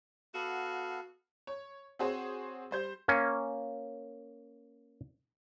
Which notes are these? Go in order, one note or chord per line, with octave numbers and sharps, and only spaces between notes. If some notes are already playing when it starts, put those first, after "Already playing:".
B3 F#4 A4 F5
C#5
C4 F#4 G#4 C5 C#5
G3 C5 G6
A#3 C#4